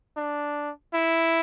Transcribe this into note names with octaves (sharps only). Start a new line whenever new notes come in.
D4
E4